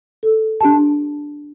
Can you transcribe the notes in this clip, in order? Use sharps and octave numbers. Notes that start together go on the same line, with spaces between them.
A4
D4 G4 A5